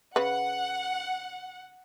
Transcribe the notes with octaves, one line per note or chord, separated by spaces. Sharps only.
C#3 B4 F#5